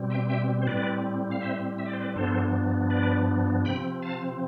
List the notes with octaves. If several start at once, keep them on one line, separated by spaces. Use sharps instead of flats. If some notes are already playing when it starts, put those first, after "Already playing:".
Already playing: B2 G3 C4
E5 G5
E5 G5
C5
A2 G3 C4 B4 D5
F5
C5 E5
E5
D5
C5
B4 D5
G2 F3 B3 D4 A4 C5
B4 D5
C3 F3 C4 G5 B5
F5 A5